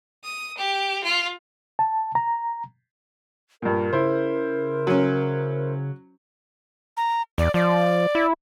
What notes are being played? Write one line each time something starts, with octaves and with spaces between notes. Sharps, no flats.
D#6
G4
F4
A5
A#5
G2 A#2 A#4
C#3 E4 C5
F#3 C#4
A#5
E2 D5
F3 D5
E4